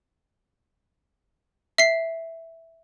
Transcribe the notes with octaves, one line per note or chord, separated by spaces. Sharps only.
E5 C7